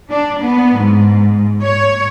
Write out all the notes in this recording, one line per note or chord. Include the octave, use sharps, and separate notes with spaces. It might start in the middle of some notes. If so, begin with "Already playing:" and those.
D4
B3
G#2
C#5